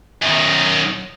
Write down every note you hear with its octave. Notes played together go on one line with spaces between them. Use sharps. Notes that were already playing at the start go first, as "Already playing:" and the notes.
F#2 D#3